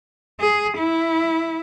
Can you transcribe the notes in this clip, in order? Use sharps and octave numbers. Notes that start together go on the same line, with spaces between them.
G#4
E4